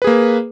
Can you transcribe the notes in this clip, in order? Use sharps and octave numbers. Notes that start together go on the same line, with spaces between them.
A#3 G#4 B4